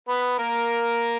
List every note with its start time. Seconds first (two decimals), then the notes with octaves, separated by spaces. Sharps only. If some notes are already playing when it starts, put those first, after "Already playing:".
0.08 B3 B4
0.38 A#3 A#4